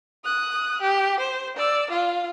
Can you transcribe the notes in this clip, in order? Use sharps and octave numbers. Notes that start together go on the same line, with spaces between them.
D#6 F#6
G4
C5
D5 E6
F4 F5